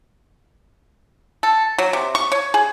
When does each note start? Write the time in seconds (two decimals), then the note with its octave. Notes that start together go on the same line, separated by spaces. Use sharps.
1.43 A4
1.78 F#3
1.93 C3
2.15 C#6
2.32 C#5
2.54 G#4